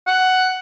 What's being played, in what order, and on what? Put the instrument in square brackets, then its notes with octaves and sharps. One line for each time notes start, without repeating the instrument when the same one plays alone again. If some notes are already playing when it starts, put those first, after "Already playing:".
[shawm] F#5